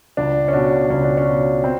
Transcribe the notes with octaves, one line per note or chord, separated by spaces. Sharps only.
C#2 D4
C#4
B2 D4
C#2 C#4
D4
C#4
B2
C4